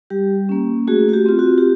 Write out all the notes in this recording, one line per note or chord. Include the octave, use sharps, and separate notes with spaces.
G3 G4
A#3 C#4
A3 F#4 G#4
F#4
G4
C4 F4
F#4
G4